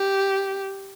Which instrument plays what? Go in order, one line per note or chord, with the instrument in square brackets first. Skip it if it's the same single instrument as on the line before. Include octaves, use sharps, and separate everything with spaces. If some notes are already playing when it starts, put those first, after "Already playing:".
Already playing: [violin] G4